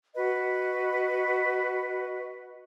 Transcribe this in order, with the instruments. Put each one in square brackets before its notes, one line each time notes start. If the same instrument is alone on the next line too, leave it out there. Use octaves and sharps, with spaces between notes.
[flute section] F#4 B4 D#5